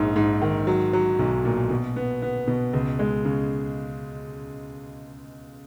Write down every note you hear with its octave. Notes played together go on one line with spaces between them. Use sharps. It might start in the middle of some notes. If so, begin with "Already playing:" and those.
Already playing: A#1 G#2
G#2
D#3
F#3
F#3
B1
A#2
B2
B3
B3
B2
C#2
G#3
C#3